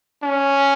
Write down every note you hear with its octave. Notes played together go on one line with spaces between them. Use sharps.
C#4